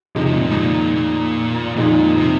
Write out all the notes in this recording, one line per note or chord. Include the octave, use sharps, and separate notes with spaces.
F2 C3 D#3 G#3 D#4
C3
A#2
G#2
C3
A#2
A#2
F2 A#2 D#3 G#3
C3